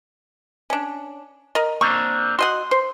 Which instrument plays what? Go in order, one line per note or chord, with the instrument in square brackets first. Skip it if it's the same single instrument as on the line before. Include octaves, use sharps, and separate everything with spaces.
[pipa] C#4 D4
A#4 D#5
[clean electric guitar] A#3 C4 D4 [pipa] C#6
[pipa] F#4 D#5 F#5 [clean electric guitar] C6
[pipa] C5